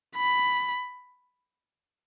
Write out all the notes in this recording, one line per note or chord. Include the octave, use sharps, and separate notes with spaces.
B5